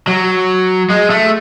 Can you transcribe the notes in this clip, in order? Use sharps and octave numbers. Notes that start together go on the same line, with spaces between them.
F#3
G#3
A3